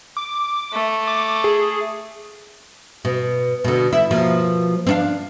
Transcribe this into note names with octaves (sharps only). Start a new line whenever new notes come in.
D6
A3
D6
G#4
B2
B2 D3
E4
B2 F3 A#3
C4 D4 F5